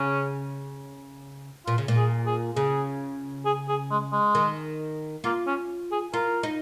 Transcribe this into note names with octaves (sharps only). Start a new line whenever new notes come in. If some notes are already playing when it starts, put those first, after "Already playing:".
Already playing: C#3 C#4
A#2 F4
C#3
A#2
G#4
G#4
C#3 G#4
G#4
G#4
G#3
G#3
D#3
A#3 F4
C#4
G#4
F4 A#4
D#4